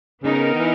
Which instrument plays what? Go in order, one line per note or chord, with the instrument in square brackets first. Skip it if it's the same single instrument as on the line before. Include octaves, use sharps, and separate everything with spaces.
[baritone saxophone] C#3 [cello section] B3 D#4 A#4
[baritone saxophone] D#3
E3